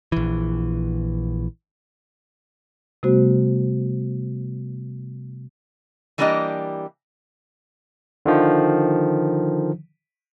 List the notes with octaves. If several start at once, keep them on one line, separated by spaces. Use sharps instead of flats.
A#1 E3
C3 G3 A3 B3 F#4 C5
E3 G3 A#3 D4 G4 D#5
D3 D#3 F3